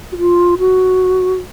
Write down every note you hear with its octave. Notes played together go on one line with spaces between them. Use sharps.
F#4
F4
F#4